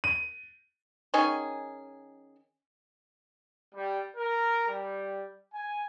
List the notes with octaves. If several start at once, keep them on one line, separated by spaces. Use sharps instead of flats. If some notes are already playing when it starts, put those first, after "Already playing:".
D#7
D#3 C#4 D#4 G#4
G3
A#4
G3
G#5